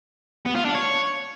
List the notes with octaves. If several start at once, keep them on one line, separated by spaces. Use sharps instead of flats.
B3
F4
D4
C#5